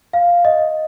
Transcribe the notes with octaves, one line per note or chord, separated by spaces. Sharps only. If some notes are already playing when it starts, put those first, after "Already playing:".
F5
D#5